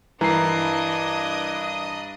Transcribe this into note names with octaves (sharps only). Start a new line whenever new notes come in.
G2 E3 D4 A#4 D#5 A#5 C7